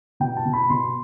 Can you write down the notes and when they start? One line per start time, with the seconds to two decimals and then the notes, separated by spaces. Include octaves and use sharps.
0.20 B2 G5
0.37 A5
0.45 B2
0.53 B5
0.70 B2 C6